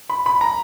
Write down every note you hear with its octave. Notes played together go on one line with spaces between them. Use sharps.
B5
B5
A#5